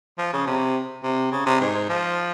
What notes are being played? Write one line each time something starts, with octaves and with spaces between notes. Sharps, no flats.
F3
C#3
C3
C3
C#3
C3
G#2
F3